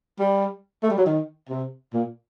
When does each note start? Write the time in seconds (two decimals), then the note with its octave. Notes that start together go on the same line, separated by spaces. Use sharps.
0.19 G3
0.83 A3
0.90 G3
0.98 F#3
1.06 D#3
1.49 C3
1.94 A#2